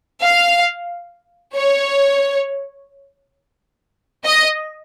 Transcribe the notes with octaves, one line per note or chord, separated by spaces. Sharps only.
F5
C#5
D#5